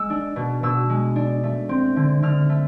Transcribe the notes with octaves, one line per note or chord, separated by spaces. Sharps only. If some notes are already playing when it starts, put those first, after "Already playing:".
Already playing: G#3 E6
D4
B2
B2 E6
G#3
D4
A3
C4
D3
D3 F6
A3